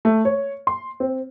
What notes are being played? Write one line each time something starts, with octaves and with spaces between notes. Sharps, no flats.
A3
C#5
C6
C4